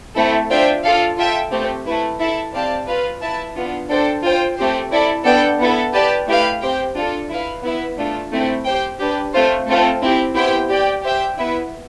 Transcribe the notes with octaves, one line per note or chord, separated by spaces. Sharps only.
A3 C4 E4 A4
D4 F4 C5 E5 G5
F4 A4 D5 F5
F4 A4 E5 G5
A3 C4 G4
A3 E4 B4
E4 A4 E5 A5
C4 G4 D5 F5 A5
F4 B4 F5
E4 B4 E5 A5
B3 D4 F4
D4 A4 C5 G5
F4 C5 G5
A3 C4 G4 C5
E4 A4 D5
B3 D4 A4 D5 G5
B3 E4 A4
G4 B4 D5 A5
A3 E4 G4 B4 F5
C4 G4 C5 G5
D4 F4 A4
E4 B4 F5
B3 E4 B4 E5
A3 D4 F4 A4
A3 C4 E4
G4 C5 G5
D4 G4 B4
A3 C4 F4 C5
A3 C4 F4 A4
C4 E4 G4
B3 E4 G4 C5 G5
G4 D5 G5
G4 C5 E5 G5
B3 E4 B4 E5